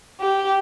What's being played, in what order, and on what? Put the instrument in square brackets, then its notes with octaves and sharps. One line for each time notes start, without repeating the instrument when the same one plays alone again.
[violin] G4